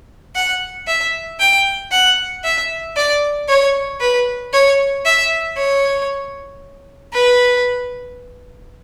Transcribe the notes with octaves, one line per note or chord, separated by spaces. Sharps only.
F#5
E5
G5
F#5
E5
D5
C#5
B4
C#5
E5
C#5
B4